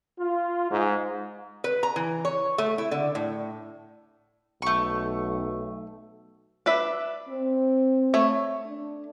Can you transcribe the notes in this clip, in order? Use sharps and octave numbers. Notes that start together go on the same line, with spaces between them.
F4
G#2
B4
A#5
E3
C#5
A3
E4
D3
A2
B1 A3 C#6
D4 B4 E5
C4
A3 C#5
D4